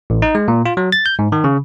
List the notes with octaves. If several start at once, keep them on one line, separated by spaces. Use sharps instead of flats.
A1
D#4
G#3
A#2
F4
F#3
A6
G6
G#2
D#3
C#3